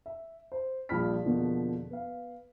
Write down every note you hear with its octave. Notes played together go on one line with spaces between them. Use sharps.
E5
C5
A#1 F3 G3 B5 F6 B6
E2 B2 D3 F3 A#3
B3 F5